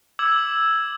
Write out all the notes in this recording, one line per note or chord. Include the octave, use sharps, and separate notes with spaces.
D6 E6 G#6 F#7